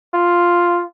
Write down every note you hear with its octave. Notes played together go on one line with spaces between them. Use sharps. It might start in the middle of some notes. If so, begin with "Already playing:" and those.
F4